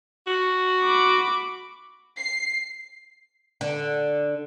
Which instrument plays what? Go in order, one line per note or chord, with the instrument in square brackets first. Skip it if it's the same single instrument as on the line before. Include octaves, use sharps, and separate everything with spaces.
[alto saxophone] F#4
[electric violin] B5 D6
[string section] C7
[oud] D3